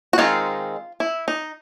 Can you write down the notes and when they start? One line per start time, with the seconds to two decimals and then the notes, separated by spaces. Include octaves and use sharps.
0.13 F#4
0.18 D#3 G#3 C4 D#4 F4
1.00 E4
1.28 D#4